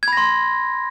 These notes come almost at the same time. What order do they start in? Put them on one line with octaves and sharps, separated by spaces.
G#6 B5 A#6 C6